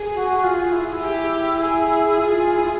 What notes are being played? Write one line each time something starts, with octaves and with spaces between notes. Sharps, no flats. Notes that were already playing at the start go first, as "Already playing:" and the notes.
Already playing: G#4
F#4
F4
E4
E4
G4
G#4
F4
E4
F4